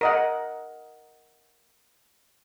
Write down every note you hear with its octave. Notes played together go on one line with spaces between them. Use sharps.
A#4 D#5 F#5